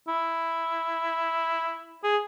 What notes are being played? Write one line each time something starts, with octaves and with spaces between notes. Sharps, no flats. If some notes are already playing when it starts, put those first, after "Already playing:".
E4
G#4